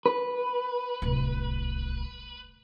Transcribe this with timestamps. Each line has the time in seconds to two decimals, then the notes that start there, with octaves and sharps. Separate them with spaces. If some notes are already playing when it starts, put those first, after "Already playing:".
0.06 B4
1.02 D1 C2